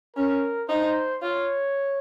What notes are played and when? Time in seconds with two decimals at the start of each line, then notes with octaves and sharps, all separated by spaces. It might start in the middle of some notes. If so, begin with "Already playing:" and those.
0.16 C#4 A#4
0.69 D#4 C5
1.22 F4 C#5